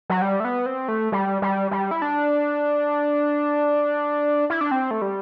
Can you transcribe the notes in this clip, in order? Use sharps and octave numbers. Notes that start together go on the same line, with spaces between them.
F#3
G3
A3
B3
C4
A3
G3
G3
G3
E4
D4
E4
D4
C4
A3
G3